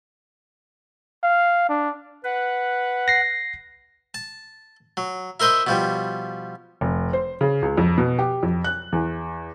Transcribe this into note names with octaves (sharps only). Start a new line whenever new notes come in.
F5
D4
B4 F#5
A#6 C7
A5
F#3
E4 A#4 C5 D#5 E5
B2 F3 G3
F1
C5
C#3
C#2
F2
B2
G4
F2
F#6
E2